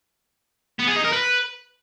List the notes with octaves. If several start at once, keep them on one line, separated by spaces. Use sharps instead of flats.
B3
G#4
D#4
A#4
B4